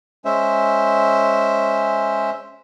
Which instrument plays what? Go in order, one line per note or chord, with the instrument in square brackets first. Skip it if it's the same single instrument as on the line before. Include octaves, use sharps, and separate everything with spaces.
[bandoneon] G#3 C#4 C5 E5